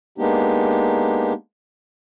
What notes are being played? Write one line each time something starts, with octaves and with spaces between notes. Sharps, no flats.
G#3 A#3 B3 D4 D#4 G4